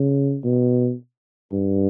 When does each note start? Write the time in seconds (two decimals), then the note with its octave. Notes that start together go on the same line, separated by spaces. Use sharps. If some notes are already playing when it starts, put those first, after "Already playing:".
Already playing: C#3
0.44 B2
1.52 G2